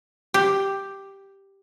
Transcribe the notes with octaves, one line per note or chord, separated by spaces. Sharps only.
G4